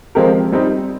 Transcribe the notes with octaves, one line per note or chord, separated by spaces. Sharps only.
F3 G#3 C4 G4 A#4
G3 C4 D#4